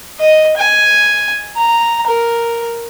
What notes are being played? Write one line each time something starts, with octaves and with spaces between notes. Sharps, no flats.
D#5
G#5
A#5
A#4